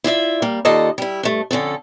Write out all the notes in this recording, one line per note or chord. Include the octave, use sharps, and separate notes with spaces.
E4 F4 D5 E5
G3 A#3
D#2 F4 A4 D5 D#5
G3 E4
G2 A3
F2 D3 C#4 A4